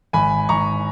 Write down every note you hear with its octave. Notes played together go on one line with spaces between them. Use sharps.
G#1 G#5 B5
G#1 A#5 C#6